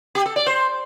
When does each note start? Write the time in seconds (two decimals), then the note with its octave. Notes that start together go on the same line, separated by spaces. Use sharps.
0.15 G4
0.26 A4
0.36 D5
0.46 C5